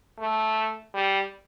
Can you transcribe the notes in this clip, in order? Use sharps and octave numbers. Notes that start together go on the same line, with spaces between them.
A3
G3